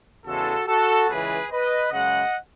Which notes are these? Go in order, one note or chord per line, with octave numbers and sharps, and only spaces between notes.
E2 C#3 E3 G#3 F#4 A4
F#4 A4
C#2 C#3 E3 G#4 B4
B4 D#5
F#2 C#3 G#3 D#5 F#5